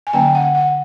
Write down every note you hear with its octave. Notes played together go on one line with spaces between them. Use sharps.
G#5
D3 F#3 A#3 C#4 G5
F#5
F#5